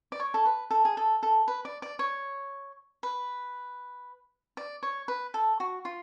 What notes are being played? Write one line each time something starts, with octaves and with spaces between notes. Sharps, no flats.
D5
C#5
A4
B4
A4
G#4
A4
A4
B4
D5
D5
C#5
B4
D5
C#5
B4
A4
F#4
F4